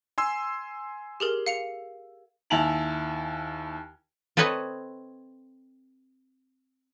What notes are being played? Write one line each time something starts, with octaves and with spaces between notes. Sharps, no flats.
G#5 C6 E6
G4 G#4 A#4
F5 C#7 F7
D#2 E4 G#5 A5 F7 F#7
C4 A4 B4 C#5 D#5 A5